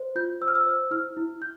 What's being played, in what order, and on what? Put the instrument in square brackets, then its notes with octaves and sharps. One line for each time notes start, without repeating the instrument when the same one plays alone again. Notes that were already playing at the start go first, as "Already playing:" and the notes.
Already playing: [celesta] C5
F4 G6
C5 E6
F6
E6
C5
E4 F6
E4
E4 G6